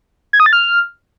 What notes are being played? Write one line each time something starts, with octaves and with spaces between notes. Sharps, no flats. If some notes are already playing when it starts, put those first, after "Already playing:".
G#6
D#6
A6
F6